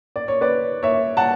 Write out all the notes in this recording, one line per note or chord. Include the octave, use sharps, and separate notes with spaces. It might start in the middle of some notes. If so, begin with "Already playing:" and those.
D5
C#5
B4 D5
C#5 E5
F#5 A5